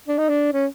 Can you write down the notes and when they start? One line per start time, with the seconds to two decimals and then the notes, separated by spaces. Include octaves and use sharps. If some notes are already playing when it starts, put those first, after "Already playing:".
0.08 D4
0.18 D#4
0.29 D4
0.53 C#4